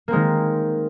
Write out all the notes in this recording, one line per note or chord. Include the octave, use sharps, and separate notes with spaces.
D#3 G#3 A#3 C4